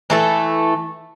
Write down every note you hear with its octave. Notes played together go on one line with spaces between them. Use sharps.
E3 A3 A4